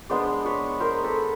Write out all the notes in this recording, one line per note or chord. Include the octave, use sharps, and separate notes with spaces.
G#3 B3 D4 C5 D5
B4 C#5
A#4 C5
A4 B4